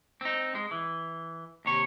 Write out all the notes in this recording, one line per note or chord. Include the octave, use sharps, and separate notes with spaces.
C4 D#4
G#3
E3
D#2 C3 C#5